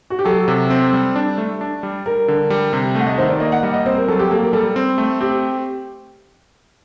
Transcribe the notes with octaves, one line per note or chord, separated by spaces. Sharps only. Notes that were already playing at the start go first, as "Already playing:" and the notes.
F#4
G4
F#3 A4
C3
C4
G3
D4
A3
D4
G3
G3 A#4
D3
G3
C3
A3 F#5
D#5
D#3 C5
D5
A#3 D#5
F#5
G3 D#5
D#5
C4 C5
A#4
F#3 A4
G4
A#3 A4
A#4
G3 A4
C4
A3
C4 G4